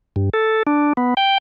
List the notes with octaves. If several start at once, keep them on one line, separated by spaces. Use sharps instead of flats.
G2
A4
D4
B3
G5